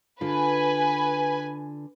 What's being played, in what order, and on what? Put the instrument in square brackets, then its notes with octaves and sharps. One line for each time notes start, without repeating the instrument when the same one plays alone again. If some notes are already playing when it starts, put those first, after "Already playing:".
[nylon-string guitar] D3 F4 [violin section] B4 G#5